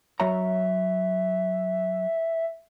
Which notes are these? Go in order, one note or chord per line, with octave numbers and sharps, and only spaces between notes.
F#3 C#5 E5 A#5